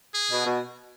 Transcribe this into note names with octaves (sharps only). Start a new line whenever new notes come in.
G#4
B2
B2